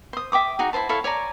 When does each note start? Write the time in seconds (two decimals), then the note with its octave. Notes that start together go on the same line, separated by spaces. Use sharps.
0.13 C5 D#6
0.32 E5 G5 D6 D#6
0.59 D#4 F#4 G#4
0.73 E4 F4 C5 A5
0.89 E4 A4 C#5 F5
1.04 C#5 D5 G#5 A#5